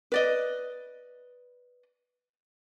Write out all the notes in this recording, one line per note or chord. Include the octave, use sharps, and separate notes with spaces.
B4 D5 D#5